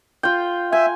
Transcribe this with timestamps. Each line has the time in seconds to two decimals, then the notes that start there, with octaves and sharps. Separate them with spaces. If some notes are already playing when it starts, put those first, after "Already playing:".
0.23 F4 G5
0.72 E5 G#5